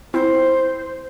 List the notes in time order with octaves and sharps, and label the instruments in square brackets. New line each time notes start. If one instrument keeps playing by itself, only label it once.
[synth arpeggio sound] B3 C4 E4 [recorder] C5